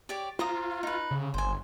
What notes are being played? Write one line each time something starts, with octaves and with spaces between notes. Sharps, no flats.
G4 C#5 D5
F4 C5 A#5 D#6
D#4 B4
C#3
G1 C5 G#5